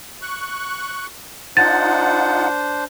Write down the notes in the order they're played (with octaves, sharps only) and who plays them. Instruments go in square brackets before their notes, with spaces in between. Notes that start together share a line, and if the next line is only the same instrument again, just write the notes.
[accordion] C#6 F#6
[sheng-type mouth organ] D4 C5 [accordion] D#4 F4 F#5 [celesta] A6